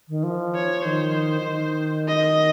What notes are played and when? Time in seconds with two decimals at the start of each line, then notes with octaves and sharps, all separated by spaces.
0.09 D#3
0.23 F3
0.55 C#5
0.85 D#3 C5
1.41 F3
1.46 D#3
2.08 D#5